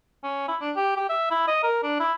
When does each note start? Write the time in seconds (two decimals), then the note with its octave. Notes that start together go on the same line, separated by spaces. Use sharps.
0.24 C#4
0.48 E4
0.61 D4
0.76 G4
0.97 G4
1.09 E5
1.31 E4
1.48 D#5
1.63 A#4
1.83 D4
2.00 E4